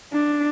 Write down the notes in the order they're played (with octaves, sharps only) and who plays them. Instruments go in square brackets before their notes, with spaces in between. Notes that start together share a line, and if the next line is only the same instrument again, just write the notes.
[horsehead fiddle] D4